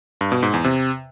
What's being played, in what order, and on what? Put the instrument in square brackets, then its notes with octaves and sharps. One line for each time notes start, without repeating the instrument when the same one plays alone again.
[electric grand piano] G2
B2
G#2
E2
C3